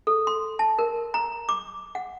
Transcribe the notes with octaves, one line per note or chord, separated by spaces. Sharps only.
A4
C6
A5
A#4
A#5
D6
F#5